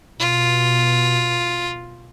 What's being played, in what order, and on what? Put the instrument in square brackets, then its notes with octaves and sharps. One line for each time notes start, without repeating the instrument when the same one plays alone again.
[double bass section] B2 [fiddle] F4